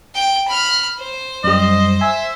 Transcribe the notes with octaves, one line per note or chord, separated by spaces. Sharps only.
G5
B5 F6
C5
F#2 G3 D#5
E5 G#5